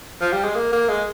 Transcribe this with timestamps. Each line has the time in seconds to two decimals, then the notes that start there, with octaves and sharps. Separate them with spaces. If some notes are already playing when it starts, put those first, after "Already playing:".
0.21 F3
0.33 G3
0.44 G#3
0.55 A#3
0.73 A#3
0.88 G#3